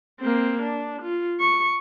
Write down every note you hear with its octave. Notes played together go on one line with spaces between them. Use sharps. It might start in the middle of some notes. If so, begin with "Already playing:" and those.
A#3 C4
D4
F4
C#6